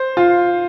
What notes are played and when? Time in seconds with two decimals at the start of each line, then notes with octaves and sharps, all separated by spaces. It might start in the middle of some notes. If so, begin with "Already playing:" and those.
Already playing: C5
0.17 F4